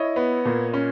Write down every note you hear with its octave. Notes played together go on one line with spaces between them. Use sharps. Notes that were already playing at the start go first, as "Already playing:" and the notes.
Already playing: E4 C#5 D#5
B3
A#2
C#4